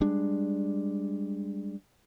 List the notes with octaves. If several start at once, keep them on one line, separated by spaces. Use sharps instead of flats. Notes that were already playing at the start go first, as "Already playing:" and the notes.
G3 G#3 D4